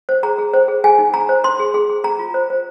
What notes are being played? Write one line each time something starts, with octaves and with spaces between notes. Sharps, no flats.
C5
G#4 A#5
G#4
C5
G#4
G#4 G#5
D#4
G#4 A#5
C5
C5 C6
G#4
G#4
G#4
G#4 A#5
F4
C5
C5